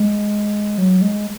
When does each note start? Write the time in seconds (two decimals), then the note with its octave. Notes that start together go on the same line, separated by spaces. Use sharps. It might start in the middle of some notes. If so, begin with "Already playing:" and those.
Already playing: G#3
0.78 F#3
1.02 G#3